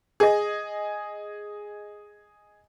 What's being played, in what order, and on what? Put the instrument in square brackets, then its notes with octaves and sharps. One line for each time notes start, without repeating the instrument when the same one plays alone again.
[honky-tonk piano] G#4 D#5